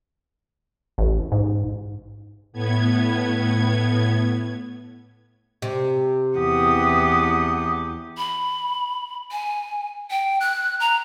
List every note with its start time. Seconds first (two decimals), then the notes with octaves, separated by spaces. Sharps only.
0.98 A1
1.32 G#2
2.53 A2 B3 G#6
5.62 C3
6.38 E2 G4 F#5 D#6
8.17 B5
9.31 G#5
10.11 G5
10.40 F#6
10.80 A#5